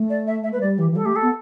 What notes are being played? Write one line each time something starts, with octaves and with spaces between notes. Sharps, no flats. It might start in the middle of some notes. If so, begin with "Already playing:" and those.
Already playing: A3
D5
E5
E5
A3 B4
G3 D5
E3 G4
E3
G3 A4
A3 G4
A4
B3